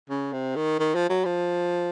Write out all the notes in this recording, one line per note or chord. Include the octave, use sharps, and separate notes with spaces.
C#3
C3
D#3
D#3
F3
F#3
F3